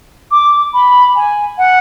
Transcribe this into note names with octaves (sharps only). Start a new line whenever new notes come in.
D6
B5
G#5
F#5